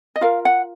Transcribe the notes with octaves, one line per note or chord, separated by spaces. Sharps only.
D#5
F4 A#4 F5
F#5